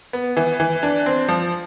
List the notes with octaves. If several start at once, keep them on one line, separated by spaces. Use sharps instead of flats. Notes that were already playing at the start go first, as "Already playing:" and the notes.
B3
E3
E3
D4
C4
F3